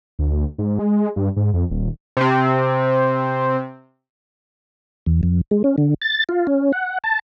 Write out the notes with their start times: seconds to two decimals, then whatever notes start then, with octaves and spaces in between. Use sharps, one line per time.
0.19 D2
0.58 G#2
0.79 G#3
1.16 G2
1.36 G#2
1.54 F2
1.70 D#1
2.17 C3 C4
5.06 E2
5.23 F2
5.51 G#3
5.64 C#4
5.78 D3
6.02 A6
6.29 F4
6.47 C#4
6.73 F#5
7.04 A5